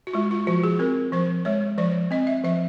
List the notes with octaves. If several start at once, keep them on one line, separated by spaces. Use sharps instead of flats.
F#4
G#3 F4
F4
F3 F#4
G#4
C4 A#4
F3 C5
G#3 C#5
F3 D5
C4 D#5
E5
F3 E5